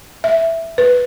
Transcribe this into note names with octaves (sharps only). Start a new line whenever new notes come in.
E5
B4